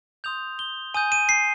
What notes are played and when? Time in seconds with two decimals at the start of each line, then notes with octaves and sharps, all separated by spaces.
0.24 C6 D#6 G6 F7
0.59 G7
0.94 G#5 D#6 G6 D#7
1.12 D#7
1.29 C7